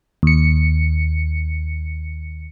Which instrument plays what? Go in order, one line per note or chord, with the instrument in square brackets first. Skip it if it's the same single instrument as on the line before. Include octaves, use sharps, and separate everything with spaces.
[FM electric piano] D#2 C#7